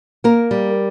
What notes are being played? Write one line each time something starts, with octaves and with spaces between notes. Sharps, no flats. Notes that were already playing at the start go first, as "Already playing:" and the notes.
A#3 A#4
G3